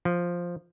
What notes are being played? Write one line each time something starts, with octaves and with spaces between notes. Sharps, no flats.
F3